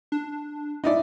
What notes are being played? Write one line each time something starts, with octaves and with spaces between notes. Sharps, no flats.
D4
D#4 E4 D5